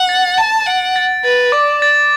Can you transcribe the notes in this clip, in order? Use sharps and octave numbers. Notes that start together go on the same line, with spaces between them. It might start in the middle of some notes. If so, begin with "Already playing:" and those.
Already playing: F#5
A6
A5 A6
F#5 D7
A6
B4 A6
D5 D6
A6